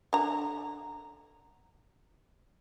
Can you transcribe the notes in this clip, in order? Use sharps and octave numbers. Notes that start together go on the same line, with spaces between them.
D3 A#5